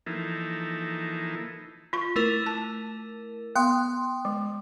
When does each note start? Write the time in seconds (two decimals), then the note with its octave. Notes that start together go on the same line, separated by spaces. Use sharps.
0.06 E3 F3 A#3 D#4 E4 A4
1.93 F4 C#6
2.16 A3 E4 A#4
2.46 A5
3.56 B3 G5 C6 D#6
4.25 G#3